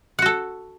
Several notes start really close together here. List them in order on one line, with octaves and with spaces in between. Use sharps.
F#5 F#4 A4